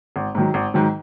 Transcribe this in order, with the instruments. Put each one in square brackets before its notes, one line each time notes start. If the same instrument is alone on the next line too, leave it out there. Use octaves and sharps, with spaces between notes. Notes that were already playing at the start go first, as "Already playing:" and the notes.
[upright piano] G#1
G#2 D#3 F#3
G#1
G#2 D#3 F#3